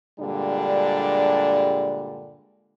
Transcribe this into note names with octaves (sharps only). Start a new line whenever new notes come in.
G2 A#2 D3 G3 G#3 D4